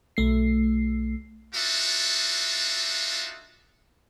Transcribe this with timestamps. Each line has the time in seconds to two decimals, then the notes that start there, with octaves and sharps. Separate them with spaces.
0.17 B1 A3 C7
1.55 D4 D#4 F4 F#4 A4 E5